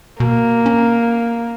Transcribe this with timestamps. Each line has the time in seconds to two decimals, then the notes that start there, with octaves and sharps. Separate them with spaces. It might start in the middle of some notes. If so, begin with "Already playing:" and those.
0.20 B2 A#3
0.66 C#4